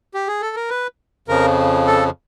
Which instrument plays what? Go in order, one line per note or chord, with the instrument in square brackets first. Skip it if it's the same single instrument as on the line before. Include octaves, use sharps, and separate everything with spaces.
[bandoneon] G4
G#4
A4
A#4
B4
F2 C#3 F3 A#4
A4